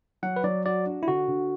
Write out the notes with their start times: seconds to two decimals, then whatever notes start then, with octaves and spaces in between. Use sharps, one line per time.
0.23 F#3 F#5
0.36 B4
0.44 F#3 D5
0.65 F#4 D5
0.86 D4
1.03 E4
1.08 D3 F#4
1.28 D3